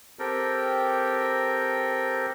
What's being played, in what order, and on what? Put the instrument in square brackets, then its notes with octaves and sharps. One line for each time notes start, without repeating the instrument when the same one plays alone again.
[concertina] C4 G4 A4 A#4 G5